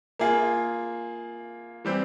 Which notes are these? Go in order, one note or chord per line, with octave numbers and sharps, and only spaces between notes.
A#3 F4 G#4
E3 G3 C4